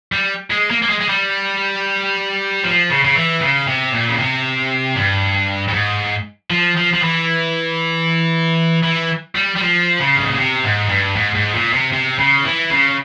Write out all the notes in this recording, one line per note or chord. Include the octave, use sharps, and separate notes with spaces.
G3
G#3
A#3
A#3
G#3
G#3
G3
F3
C#3
C#3
E3
C#3
C3
A#2
C#3
C3
G2
G2
G#2
F3
F3
F3
E3
E3
G3
G3
F3
C#3
G2
G#2
A#2
C3
G#2
G2
G#2
G#2
A#2
C3
C3
C#3
E3
C#3